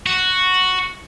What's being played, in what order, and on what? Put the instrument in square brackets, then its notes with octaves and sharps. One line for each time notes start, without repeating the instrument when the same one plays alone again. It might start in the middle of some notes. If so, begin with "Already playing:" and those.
[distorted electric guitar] F#4